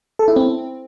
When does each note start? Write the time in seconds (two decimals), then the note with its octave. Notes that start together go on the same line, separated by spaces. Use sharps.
0.19 A4
0.28 E4
0.36 C4